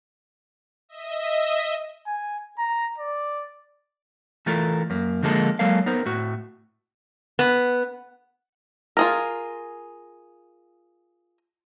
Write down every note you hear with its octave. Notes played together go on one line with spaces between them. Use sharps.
D#5 E5
G#5
A#5
D5
E3 A3 F4 A4 A#4
F#2 A#3
D3 F3 G#3 A#3 A4
F#3 G#3 A#3 A4 A#4 F5
B3 D#4 A#4 C5
A2 F#4
B3
F4 G#4 A#4